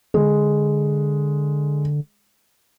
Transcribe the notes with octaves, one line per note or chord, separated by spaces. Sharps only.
D3 G#3